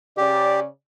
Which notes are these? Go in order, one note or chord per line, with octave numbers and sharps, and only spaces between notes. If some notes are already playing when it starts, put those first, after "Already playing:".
C#3 G4 D5